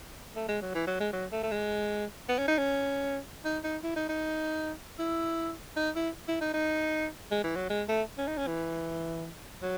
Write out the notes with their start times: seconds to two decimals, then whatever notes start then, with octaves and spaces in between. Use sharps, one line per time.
0.36 A3
0.48 G#3
0.61 F#3
0.74 E3
0.87 F#3
1.00 G#3
1.13 F#3
1.32 A3
1.43 A3
1.51 G#3
2.29 B3
2.38 C#4
2.48 D#4
2.58 C#4
3.45 D#4
3.64 D#4
3.83 E4
3.96 D#4
4.09 D#4
4.99 E4
5.76 D#4
5.96 E4
6.28 E4
6.41 D#4
6.53 D#4
7.31 G#3
7.44 E3
7.56 F#3
7.70 G#3
7.89 A3
8.18 C#4
8.27 D#4
8.37 C#4
8.47 E3
9.62 F#3